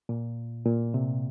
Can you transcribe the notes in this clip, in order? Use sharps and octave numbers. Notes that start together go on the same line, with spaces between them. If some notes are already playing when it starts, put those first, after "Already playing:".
A#2
A#2
C3